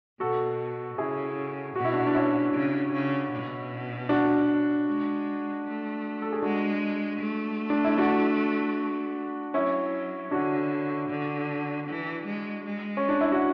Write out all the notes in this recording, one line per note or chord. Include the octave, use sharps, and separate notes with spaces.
B2 F#4 A4
C#3 E4 G#4
B2 F#4
E4
D4 F#4
D4
C#4 E4
C#3
C#3
B2
D4 F#4
G#3
A3
A4
G#4
G#3 D4 F#4
A3
D4
E4
D4 F#4
F#3 C#4 E4
D3 D4 F#4
D3
E3
G#3
G#3
C#4
D4
E4
F#4